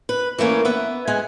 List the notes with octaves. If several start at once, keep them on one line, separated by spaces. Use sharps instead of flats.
B4
E3 A3 A#3 C#4
B3 B4 E5
G#3 B3 G#5